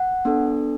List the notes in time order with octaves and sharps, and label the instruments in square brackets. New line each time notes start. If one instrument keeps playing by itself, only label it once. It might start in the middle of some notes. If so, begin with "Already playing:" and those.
Already playing: [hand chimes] F#5
B3 D4 A4